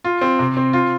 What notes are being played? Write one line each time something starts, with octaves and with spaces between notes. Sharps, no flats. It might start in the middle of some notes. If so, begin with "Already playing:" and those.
F4
C4
C3
C4
F4